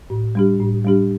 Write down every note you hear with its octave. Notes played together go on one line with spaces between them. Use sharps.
A2
G3 D4 G4
A2
G3 D4 G4